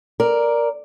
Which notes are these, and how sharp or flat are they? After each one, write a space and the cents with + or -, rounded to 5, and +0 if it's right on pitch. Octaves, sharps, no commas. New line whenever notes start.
A#4 +5 D5 +0